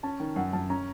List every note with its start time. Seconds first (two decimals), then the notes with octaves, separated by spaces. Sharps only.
0.03 C#4 A5
0.20 D#3
0.36 F#2 F#5
0.53 F#2 A5
0.70 C#4 A#5